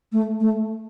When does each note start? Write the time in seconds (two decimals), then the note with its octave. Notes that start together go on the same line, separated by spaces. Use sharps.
0.12 A3
0.40 A3